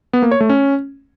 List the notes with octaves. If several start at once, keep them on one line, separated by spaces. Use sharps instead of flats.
B3
A#3
C#5
A3
C#4